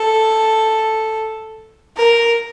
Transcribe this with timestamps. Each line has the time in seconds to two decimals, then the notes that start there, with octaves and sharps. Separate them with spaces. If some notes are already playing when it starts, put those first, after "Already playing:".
Already playing: A4
1.97 A#4